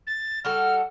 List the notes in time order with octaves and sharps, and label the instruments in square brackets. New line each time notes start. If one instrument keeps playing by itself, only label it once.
[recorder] A6
[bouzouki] G3 F#4 A4 [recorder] F6